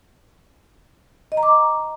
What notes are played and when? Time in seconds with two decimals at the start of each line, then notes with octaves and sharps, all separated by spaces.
1.32 D#5
1.37 A#5
1.43 D6
1.48 A#5